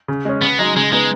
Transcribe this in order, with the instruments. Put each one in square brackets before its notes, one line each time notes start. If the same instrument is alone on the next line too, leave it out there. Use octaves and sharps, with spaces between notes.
[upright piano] C#3
G#3 C#4
[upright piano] C#3 [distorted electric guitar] B3
[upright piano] F#3 D#4 [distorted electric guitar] G#3
[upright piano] C#3 [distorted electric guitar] G#3
[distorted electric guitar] G#3 [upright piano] B3 D#4